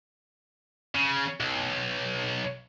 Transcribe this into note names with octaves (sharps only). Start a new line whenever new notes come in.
C#3
B1